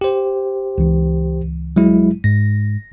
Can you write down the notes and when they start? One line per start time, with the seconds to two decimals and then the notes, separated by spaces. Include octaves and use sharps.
0.01 G4 C5
0.78 C#2 E3
1.76 F#3 G#3 E4
2.24 G#2 A#6